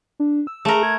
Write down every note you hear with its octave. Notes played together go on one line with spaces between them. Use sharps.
D4
E6
A3 G#4 A#4
G#6